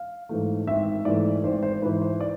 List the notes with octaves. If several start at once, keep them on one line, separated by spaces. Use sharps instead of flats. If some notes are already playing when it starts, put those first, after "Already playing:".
Already playing: F5
G#2 E3 A3
G#1 E5
G#2 E3 A3 D5
G#1 C5
C5
G#2 E3 B4
C5
D5